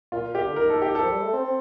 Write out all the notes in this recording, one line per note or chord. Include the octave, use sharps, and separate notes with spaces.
A#2 F4
A#2
A#2 G4
D3
D#3 A#4
A4
G4
A4
F3
G3
A3
C4
C4